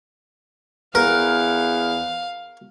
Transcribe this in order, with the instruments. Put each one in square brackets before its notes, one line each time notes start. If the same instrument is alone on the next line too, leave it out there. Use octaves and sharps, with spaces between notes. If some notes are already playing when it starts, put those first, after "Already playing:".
[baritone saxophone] E2 [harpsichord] A#4 [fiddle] F5